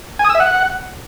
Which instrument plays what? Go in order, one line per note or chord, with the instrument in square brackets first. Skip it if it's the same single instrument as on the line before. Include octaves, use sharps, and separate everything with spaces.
[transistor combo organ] G#5
D#6
E6
E5
F#5